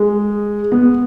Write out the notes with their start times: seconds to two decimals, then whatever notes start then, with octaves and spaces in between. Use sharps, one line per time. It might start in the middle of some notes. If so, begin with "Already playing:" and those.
Already playing: G#3
0.72 B3